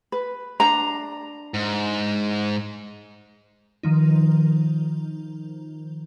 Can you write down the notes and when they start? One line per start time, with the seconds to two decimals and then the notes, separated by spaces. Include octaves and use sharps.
0.12 B4
0.60 D4 A#5
1.54 G#2
3.83 D#3 F3 D#4